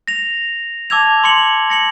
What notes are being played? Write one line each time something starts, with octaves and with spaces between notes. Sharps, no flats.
A#6 F7
A5 D6 E6 G#6 F7
C6 D6 C#7 F#7
A#6 C#7 F#7